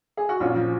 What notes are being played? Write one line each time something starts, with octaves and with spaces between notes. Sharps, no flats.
G#4
F#4
A#1 C#4 F4
F3